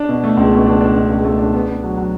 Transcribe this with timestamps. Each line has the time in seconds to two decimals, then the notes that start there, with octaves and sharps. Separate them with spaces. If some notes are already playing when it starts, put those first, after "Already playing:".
Already playing: D4
0.09 B2
0.24 A3
0.37 C#2
0.53 B2
0.66 D4
0.81 D4
0.96 B2
1.11 C#2
1.24 A3
1.39 D4
1.54 B3
1.68 B3
1.83 F#3
1.97 F#3